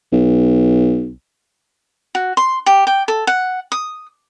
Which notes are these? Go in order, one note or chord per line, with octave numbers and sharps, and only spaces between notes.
B1
F#4
C6
G4
G5
A4
F#5
D#6